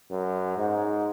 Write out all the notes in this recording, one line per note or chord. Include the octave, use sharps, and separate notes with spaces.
F#2
G#2